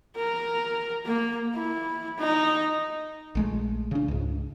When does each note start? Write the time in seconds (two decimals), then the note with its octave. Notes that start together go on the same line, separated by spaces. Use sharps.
0.16 A#4
1.05 A#3
1.54 E4
2.18 D#4
3.35 A#1 G#3 A3
3.91 C#3 D4
4.08 C#2 G#2